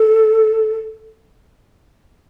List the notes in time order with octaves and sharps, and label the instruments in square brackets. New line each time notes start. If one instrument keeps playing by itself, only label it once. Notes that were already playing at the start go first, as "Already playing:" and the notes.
Already playing: [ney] A4